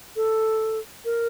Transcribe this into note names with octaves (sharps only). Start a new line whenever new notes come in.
A4
A#4